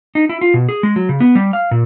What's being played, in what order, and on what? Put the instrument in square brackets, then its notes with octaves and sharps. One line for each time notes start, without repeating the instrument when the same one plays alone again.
[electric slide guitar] D#4
E4
F4
B2
G#4
G#3
F#3
C#3
B3
G3
F5
A#2